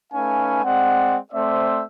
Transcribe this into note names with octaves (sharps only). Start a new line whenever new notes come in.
A3 C#4 D#4 B4 F5 G#5
G#3 C4 D5 F#5
A3 C4 C5 D5 E5